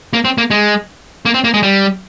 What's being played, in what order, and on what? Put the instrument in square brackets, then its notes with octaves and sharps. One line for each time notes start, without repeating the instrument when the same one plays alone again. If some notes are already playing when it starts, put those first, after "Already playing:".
[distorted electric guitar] A#3
C4
A#3
G#3
A#3
C4
A#3
G#3
G3